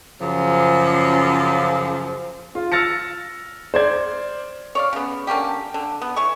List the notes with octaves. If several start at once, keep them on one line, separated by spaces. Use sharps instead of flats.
F#2 C#3 F3
F4
E6 F6 A6 A#6 C#7
C5 D5 G#6
C#5 D5 F5
C#3 B3
D3 A#3 C#4 G4
D3
B3
E3 C#5 C#6